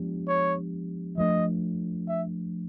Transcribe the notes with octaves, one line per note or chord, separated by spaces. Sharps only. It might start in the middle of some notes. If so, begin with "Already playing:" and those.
Already playing: F3 G#3 B3 D4 G4
C#5
F3 A3 D4 D#5
E5